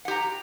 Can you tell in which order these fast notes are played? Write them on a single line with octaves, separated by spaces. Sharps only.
F#5 G4 A#5